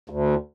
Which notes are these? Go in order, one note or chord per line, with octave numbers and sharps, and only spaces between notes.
D2